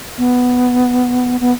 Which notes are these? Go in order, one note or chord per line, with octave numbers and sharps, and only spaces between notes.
B3
B3